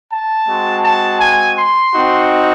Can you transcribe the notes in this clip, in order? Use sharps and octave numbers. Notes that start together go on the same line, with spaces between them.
A5
G#3 C4 F#4
A5
G#5
C6
C4 D#4 F#4